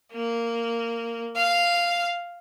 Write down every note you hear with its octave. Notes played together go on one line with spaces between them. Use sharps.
A#3
F5